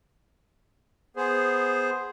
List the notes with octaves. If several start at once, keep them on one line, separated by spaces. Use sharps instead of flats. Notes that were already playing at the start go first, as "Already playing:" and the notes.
B3 G#4 C5